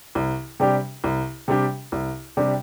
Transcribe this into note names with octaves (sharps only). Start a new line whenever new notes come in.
C2
C3 G3 D4 G4
C2
C3 G3 D4 G4
C2
C3 G3 D4 G4